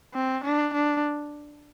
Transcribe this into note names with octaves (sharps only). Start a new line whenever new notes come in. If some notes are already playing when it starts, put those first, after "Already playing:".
C4
D4
D4